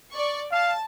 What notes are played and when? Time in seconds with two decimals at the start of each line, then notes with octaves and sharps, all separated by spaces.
0.12 D5 C#6
0.51 F5 A5